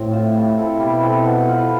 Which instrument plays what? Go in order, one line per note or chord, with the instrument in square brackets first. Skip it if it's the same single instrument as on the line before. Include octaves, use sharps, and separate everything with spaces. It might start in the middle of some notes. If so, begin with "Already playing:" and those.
Already playing: [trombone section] A2 [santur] C4
[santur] F4 C5 E5
G3
C4 E4 A4
[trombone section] B2 [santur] G3
[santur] C4 E4 A4
B3
F4 B4